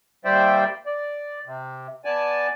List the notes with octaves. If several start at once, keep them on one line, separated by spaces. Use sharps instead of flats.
D#2 G3 C5 D5 E5 G5
D5
C3
B3 D5 G#5 A5